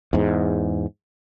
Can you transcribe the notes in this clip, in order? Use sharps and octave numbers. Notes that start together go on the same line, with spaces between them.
E2 G#2